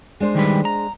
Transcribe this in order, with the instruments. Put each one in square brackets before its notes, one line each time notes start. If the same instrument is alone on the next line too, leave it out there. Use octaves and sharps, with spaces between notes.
[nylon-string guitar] G#3 D4 C5
[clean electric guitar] D#3 G3 B4
A#5